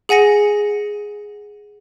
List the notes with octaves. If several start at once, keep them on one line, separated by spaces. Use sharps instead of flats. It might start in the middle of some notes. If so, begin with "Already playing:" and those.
G#4 F#5 G#5 A#6 C#7